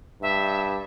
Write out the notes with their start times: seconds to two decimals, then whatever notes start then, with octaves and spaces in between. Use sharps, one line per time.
0.22 G2 E5